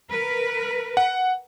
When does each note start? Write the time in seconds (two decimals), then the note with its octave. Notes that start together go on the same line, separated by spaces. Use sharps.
0.11 A#4 B4
0.97 F#5